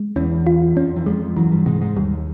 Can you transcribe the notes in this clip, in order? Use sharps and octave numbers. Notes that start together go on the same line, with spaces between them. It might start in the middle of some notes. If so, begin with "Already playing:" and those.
Already playing: G#3
E2 E3 C#4
F4
F2 F3 C#4
E3
F2 F3 G#3
F#2 E3 F#3
G2 G3
G#2 C3 G#3
G#2 G#3
D#2 D#3 G3